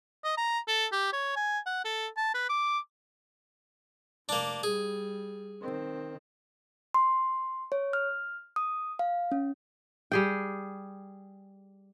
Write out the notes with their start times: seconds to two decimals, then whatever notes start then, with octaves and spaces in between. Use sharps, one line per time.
0.24 D#5
0.37 A#5
0.68 A4
0.92 G4
1.13 C#5
1.36 G#5
1.66 F#5
1.85 A4
2.17 A5
2.35 B4
2.49 D6
4.29 F1 A#3 D4
4.63 G3 G#4
5.61 D#3 C4
6.94 C6
7.72 C#5
7.93 F6
8.56 D#6
8.99 F5
9.32 C#4
10.12 G3 G#4 G5